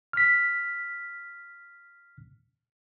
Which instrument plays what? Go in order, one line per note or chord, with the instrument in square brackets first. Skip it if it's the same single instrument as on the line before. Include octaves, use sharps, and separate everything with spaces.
[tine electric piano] F6 B6